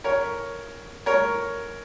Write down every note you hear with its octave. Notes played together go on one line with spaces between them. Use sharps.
A#4 C#5
A#4 C#5